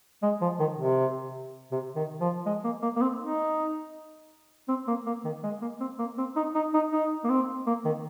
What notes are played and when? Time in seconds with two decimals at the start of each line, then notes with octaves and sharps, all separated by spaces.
0.23 G#3
0.41 F3
0.60 D#3
0.78 C3
1.72 C3
1.96 D#3
2.21 F3
2.46 G#3
2.64 A#3
2.82 A#3
2.96 A#3
3.01 C4
3.20 D#4
4.68 C4
4.87 A#3
5.06 A#3
5.24 D#3
5.44 G#3
5.61 A#3
5.80 C4
5.99 A#3
6.18 C4
6.36 D#4
6.55 D#4
6.74 D#4
6.92 D#4
7.24 A#3
7.29 C4
7.67 A#3
7.85 D#3